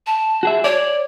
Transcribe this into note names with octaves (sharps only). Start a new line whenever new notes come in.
A5
F#4 G#4 E5
C#5 D5